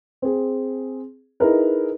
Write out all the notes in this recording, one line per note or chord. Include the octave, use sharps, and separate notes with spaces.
C4 G#4
D#4 E4 G#4 A#4 B4